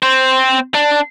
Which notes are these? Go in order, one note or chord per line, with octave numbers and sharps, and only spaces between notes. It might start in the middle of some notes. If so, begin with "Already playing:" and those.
C4 C5
D4